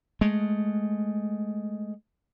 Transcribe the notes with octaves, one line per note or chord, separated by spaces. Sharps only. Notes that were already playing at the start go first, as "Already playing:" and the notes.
G#3 A3